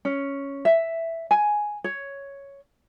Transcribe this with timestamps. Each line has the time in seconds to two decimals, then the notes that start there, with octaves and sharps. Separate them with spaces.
0.05 C#4
0.65 E5
1.31 G#5
1.84 C#5